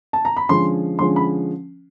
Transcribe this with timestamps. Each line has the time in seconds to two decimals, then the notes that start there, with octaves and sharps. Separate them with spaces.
0.13 A5
0.25 A#5
0.37 B5
0.49 D3 F3 G#3 C#4 C6
0.99 D3 F3 G#3 C#4 C6
1.16 B5